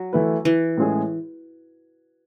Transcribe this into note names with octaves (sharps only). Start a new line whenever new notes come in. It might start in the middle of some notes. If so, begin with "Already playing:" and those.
Already playing: F#3
E3 A3 E4 B4
E3
A2 G#3 C#4 G#4